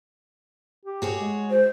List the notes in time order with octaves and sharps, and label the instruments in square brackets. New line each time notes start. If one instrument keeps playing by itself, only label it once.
[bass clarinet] G4
[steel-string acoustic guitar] F#4 G#4 C#5
[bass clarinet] G#3
[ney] C5